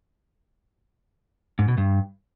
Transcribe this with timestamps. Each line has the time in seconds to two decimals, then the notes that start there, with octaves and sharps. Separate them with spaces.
1.59 G#2
1.68 B2
1.78 G2